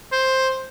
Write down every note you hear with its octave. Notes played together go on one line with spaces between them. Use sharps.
C5